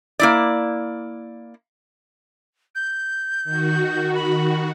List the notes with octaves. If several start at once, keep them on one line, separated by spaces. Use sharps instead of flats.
A#3 E4 D5
G6
D#3 F#4
B5